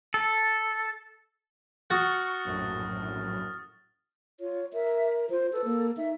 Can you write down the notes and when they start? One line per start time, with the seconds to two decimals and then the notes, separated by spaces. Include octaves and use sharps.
0.14 A4
1.90 F#4 C#6 D#6 F6 A6
2.45 A#1 F#2 A2
4.40 F4 C#5
4.73 A#4 E5
5.30 F4 C5
5.53 A4 B4
5.65 A#3
5.97 D#4 E5